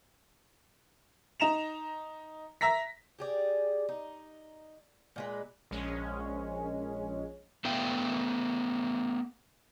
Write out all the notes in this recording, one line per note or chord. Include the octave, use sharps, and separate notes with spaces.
D#4 A#5 E7 F7
E5 A#5 A#6 B6
G4 G#4 D5
D#4
A#2 G#3 B4
A#1 G#3 C#4
A3 B3 E5 F5 G5